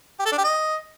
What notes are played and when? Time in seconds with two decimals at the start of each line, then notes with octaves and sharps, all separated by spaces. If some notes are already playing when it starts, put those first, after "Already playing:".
0.19 G4
0.26 A4
0.32 D4
0.38 G4
0.44 D#5